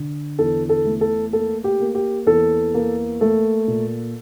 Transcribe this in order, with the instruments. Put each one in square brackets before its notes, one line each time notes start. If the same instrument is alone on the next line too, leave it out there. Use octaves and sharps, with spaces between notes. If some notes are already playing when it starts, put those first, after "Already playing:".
Already playing: [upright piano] D3
E2 A4
A4
A3
A4
A#3 A4
G4
A#3
G4
E2 A4
A#3
A3 A4
A#2